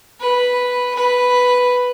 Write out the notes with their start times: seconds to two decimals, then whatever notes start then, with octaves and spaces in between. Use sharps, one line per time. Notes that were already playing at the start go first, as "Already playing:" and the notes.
0.20 B4
0.95 B4